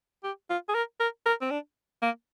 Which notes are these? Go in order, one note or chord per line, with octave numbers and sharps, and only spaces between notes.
G4
F4
G#4
A#4
A#4
A#4
C4
D4
A#3